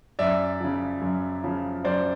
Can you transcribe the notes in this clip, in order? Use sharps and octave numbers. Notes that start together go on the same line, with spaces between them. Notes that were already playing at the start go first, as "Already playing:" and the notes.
F#2 D5 E5
C#3 F3
F#2
C#3 F3
F#2 C5 D5